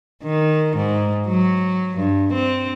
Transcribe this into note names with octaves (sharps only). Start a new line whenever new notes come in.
D#3
G#2
F#3
G2
C4